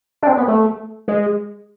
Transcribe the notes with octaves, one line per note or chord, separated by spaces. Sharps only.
D4
C4
B3
A3
G#3